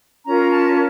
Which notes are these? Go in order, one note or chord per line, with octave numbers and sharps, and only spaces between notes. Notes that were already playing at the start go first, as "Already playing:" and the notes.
C#4 F4 A#4 A#5
A5